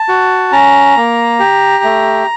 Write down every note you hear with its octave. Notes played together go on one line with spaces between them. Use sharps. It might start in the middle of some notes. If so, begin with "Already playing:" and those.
Already playing: A5
F#4
C#4 A#5
A#3
G4
A3